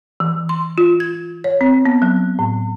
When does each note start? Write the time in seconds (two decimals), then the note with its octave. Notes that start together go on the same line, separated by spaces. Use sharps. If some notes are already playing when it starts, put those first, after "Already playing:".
0.20 E3
0.49 C6
0.78 F4
1.00 G#6
1.44 C#5
1.61 C4
1.85 B3
2.02 F#3
2.39 A2